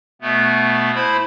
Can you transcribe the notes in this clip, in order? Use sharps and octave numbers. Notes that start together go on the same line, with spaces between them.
B2 A3 B3
E4 C5 B5